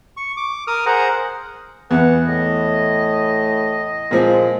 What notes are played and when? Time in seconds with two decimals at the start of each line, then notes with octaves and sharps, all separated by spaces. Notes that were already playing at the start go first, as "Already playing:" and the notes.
0.17 C#6
0.37 D6
0.67 A#4 D#6 F6
0.86 G#4 A#4 C5 F#5 A#5
1.91 E2 B4 F#5
2.27 A2 D#5
4.11 A#2 F3 G#3